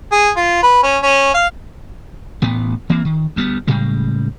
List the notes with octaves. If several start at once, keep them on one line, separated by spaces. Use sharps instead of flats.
G#4
F4
B4
C#4
C#4
F5
A1 A2 B3
E3 A#3 C4
D#3
D2 G3 B3
A2 C#3 G3 G#3